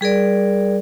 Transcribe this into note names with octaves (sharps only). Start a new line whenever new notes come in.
G3 G#4 A#4 D5